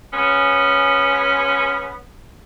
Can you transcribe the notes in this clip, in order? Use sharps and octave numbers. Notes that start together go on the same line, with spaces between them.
G#3 B3 C#4